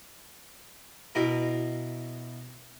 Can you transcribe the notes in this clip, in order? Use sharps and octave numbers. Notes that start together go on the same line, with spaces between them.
B2 E4 A#4